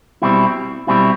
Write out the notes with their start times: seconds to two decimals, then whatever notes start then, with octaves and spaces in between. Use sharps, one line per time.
0.22 B2 G3 C4 E4
0.87 B2 G3 C4 E4